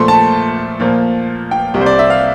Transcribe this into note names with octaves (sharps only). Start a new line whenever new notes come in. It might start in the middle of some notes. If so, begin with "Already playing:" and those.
Already playing: A#2 F3 A3 C6
A5
A#2 F3 A#3
G5
C2 C3 G3
C5
D5
E5
F5